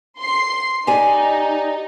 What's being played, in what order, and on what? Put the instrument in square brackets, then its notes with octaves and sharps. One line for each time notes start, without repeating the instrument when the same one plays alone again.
[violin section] C6 C7
[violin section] D#4 [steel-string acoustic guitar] G4 D5 G#5